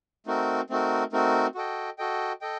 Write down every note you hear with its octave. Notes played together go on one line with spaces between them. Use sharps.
A3 C4 D#4 F#4 A#4
A3 C4 D#4 F#4 A#4
A3 C4 D#4 F#4 A#4
F#4 A4 D#5 G5
F#4 A4 D#5 G5
A4 D#5 G5